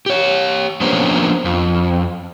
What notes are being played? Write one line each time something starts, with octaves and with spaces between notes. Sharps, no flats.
G4 C#5
F3 A#3 B3 C#4 D4 C5
F2